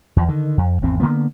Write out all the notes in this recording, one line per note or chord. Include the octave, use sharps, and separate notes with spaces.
E2 F3
D3 D#3
F2
G#1 E2 C4
D3 F3 A#3 B3